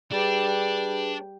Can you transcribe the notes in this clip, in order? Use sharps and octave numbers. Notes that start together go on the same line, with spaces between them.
G3 D4 G#4 B4